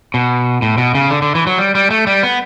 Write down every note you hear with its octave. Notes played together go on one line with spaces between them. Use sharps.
B2
A2
B2
C#3
D3
D3
E3
F#3
G3
G3
A3
G3
B3